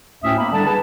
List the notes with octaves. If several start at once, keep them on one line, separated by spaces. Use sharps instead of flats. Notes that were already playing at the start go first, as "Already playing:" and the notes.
D2 A2 C#4 E5 G5 D#6
A#3 B3 B5
D3 G3 D4 A5
G#4 B4 G#5 A5